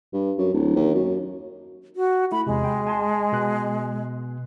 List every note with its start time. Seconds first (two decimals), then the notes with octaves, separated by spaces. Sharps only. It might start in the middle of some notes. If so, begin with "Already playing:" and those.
0.13 G2
0.38 F#2
0.54 D1
0.76 D#2
0.95 F#2
1.96 F#4
2.32 A3 E4 B5
2.47 E2 C3 G#3
2.64 G5
2.87 G#5 A5 C6
3.32 B2 B3 F#6